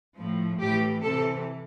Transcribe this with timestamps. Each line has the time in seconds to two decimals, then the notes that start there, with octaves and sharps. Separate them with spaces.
0.16 A2 F3
0.59 A2 E3 G4
1.02 C3 E3 A4